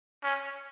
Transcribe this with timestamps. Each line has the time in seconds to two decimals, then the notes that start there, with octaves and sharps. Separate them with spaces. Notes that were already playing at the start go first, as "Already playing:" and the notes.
0.23 C#4